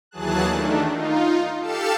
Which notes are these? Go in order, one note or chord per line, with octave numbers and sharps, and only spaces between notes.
D#2 E3 F#3 G#4 A5 F#6
D#3 A3 D4
D#4 F4
G4 A4 F5 A5 C#7 E7